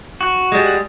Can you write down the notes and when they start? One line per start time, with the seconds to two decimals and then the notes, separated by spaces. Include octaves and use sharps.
0.21 F#4
0.52 G3 G#3